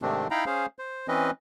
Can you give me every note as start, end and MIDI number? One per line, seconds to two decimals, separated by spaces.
0.02 0.27 44
0.02 0.27 48
0.02 0.27 51
0.02 0.27 57
0.02 0.27 60
0.02 0.27 62
0.31 0.45 63
0.31 0.45 64
0.31 0.45 77
0.31 0.45 79
0.31 0.45 82
0.31 0.45 83
0.46 0.66 61
0.46 0.66 68
0.46 0.66 72
0.46 0.66 77
0.79 1.07 72
1.08 1.31 52
1.08 1.31 60
1.08 1.31 61
1.08 1.31 71
1.08 1.31 75